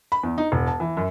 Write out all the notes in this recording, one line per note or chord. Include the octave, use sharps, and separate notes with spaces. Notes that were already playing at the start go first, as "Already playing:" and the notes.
B5
E2
D#4
E1
A5
E3
F#2